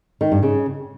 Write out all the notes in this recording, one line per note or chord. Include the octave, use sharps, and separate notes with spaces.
D#3
G2
C#3